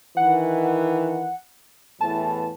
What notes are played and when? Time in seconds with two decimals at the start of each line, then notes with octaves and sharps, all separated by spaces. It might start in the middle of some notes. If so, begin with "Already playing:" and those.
0.17 D#3 E3 F#5
2.01 E2 A2 E3 A5